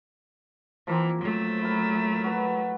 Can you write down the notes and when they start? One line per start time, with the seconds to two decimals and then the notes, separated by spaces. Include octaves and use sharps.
0.87 E3 F3 A#3 C4
1.21 F#3 A3
1.62 E4 A#4
2.24 F#4 B4 A#5